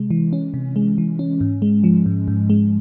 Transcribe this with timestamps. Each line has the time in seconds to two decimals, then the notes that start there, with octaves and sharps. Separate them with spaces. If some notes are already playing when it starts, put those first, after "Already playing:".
Already playing: C3 G#3
0.11 E3
0.33 C#4
0.54 C3
0.76 G#3
0.98 E3
1.19 C#4
1.41 G#2
1.62 G#3
1.84 F3
2.06 G#2
2.28 G#2
2.50 G#3